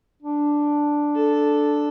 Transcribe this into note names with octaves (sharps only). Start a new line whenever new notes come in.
D4
A4